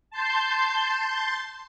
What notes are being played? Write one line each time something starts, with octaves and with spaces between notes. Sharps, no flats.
A5 C6 G6